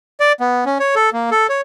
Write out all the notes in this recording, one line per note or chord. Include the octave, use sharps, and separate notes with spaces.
D5
B3
C#4
C#5
A4
A#3
A4
C#5